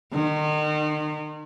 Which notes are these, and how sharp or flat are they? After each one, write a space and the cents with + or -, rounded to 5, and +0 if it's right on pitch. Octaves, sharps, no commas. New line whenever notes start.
D#3 -35